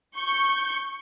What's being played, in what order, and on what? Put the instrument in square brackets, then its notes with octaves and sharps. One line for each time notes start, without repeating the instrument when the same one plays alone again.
[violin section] C#6 G6